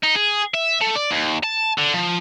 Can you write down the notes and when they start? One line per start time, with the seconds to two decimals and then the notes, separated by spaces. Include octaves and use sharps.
0.03 D#4
0.16 G#4
0.54 E5
0.81 A3
0.95 D5
1.11 D#2
1.44 A5
1.78 D3
1.94 F3